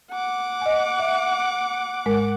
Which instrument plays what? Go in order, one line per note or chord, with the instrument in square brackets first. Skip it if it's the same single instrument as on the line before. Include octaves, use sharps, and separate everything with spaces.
[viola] F#5 D6
[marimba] D#5 G#5
E5
G#2 G#3 A#4